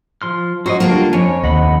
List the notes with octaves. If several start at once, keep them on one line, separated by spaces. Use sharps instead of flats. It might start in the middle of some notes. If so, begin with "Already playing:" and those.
F3 C6 F6
F#3 F#4 C5 D#5
D3 G3 A#3 D4 F4 F#4
F2 C#5 G#5
D#2 D#5 F#5 B5